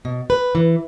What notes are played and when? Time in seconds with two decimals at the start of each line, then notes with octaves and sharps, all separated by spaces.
0.05 B2
0.30 B4
0.55 E3